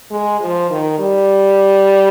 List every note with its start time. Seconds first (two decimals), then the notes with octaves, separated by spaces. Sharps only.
0.10 G#3
0.41 F3
0.70 D#3
0.99 G3